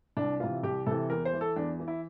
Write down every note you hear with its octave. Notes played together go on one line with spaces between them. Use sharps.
C2 D4
C3 E3 F4
C2 G4
C3 E3 A4
E2 A#4
C5
E3
A4
E2 D4
E3
E4